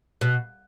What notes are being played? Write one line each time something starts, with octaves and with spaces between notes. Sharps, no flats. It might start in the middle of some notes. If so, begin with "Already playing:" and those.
B2